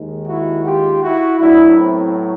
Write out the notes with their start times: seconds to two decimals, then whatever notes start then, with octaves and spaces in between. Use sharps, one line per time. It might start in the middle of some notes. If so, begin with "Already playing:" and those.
Already playing: D#2 D#3 G#3
0.27 E4 F#4
0.65 F4 G4
1.02 E4 F#4
1.40 A2 F#3 B3 D4 E4
1.78 C4